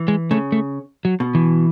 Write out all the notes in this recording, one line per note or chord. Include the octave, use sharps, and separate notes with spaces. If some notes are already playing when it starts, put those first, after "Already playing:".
Already playing: E3
G#3
C#3 A3
A3
F#3
B2
E3